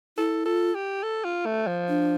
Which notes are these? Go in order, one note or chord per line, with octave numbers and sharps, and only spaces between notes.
E4 A4
F4 A4
G4
A4
F4
A3
F3
D4